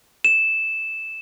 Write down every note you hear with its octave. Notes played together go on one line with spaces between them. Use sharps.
E7